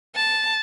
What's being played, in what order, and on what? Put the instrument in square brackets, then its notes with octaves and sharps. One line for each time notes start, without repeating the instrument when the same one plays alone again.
[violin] A5